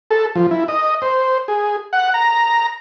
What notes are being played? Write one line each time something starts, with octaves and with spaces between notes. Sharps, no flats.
A4
F3
E4
D#5
C5
G#4
F#5
A#5